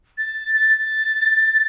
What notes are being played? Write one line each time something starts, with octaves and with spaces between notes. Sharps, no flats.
A6
A6